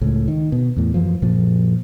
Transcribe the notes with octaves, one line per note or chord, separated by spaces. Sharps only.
C#2 A2
D#3
B2
E2 A2
F#2 E3 F3
F#2 A#2 F3